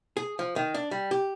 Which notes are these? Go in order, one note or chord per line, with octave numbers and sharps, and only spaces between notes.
G#4
F3
D#3
D4
G3
G4